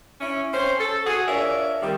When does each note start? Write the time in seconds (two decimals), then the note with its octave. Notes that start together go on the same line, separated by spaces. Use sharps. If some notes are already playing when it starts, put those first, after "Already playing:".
0.21 C#4 E4
0.53 C4 C#4 C5
0.79 A4
1.06 F#4 G#4
1.27 F3 D4 A#4 C#5 E5
1.82 C3 D#3 G3